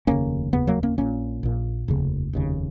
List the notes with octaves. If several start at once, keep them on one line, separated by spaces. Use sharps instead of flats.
F1 D#2 C#3 A#3 C#4
F1 D#2 C#3 B3
F#3 A#3
A#3 C#4
A#1 A#2 A#3 C#4
A#1 A#2
F1 D#2 C#3
F1 D#2 C#3